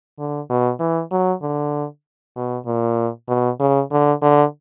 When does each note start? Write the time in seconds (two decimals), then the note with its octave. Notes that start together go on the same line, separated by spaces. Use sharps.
0.19 D3
0.50 B2
0.80 E3
1.11 F#3
1.42 D3
2.36 B2
2.66 A#2
3.28 B2
3.60 C#3
3.91 D3
4.22 D3